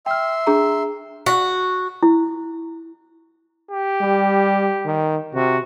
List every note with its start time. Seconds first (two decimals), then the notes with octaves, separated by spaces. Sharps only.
0.06 E5 G5 C6 F6
0.47 D4 G#4 A#5
1.26 F#4
2.03 E4
3.71 G4
4.01 G3
4.86 D#3
5.35 C3 F#4